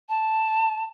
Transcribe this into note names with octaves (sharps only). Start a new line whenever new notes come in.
A5